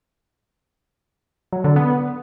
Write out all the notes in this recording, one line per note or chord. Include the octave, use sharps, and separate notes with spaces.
F#3
D3
B3